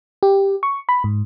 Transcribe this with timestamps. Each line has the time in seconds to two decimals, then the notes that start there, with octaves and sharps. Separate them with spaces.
0.23 G4
0.63 C#6
0.89 B5
1.04 G#2